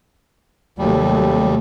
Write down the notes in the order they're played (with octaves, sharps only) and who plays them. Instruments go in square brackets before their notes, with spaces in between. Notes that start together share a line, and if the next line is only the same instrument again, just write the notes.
[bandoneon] D#2 G3 [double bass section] C3 F#3 A3